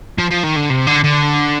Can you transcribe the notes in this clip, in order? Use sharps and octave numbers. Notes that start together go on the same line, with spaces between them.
F3
F3
D#3
D3
C3
D3
D3